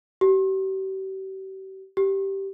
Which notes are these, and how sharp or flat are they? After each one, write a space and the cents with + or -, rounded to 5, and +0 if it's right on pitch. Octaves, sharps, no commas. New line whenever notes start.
G4 -40
G4 -10